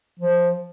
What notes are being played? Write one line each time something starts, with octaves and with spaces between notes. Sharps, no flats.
F3